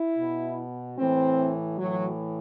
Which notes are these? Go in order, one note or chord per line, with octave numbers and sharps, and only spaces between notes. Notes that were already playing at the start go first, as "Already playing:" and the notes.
Already playing: E4
B2
A2 E3 C4
A2 E3 F#3